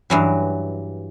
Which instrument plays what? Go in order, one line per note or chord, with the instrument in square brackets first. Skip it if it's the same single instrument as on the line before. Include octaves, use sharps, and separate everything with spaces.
[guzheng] G2 E3 F#3